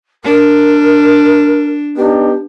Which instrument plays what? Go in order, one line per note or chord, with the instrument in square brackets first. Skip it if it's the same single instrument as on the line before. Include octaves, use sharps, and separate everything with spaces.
[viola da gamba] D4 [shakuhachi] A#4
[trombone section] B3 D#4 G4 [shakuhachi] D4